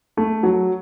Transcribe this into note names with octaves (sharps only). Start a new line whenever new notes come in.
A3
F#3